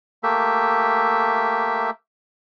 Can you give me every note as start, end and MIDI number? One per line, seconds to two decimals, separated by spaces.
0.23 1.90 57
0.23 1.90 58
0.23 1.90 67
0.23 1.90 76